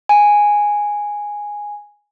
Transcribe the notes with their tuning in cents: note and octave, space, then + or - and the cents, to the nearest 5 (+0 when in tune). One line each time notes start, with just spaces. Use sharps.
G#5 -5